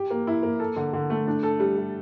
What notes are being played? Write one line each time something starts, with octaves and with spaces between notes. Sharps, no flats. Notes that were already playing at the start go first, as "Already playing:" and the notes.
Already playing: G4
A#3
E4
A#3
A4
D3
D3
A3
D4
A4
G3
G3